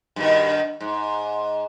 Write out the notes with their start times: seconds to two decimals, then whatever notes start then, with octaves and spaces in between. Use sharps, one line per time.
0.16 G2 B2 D#3
0.81 G#2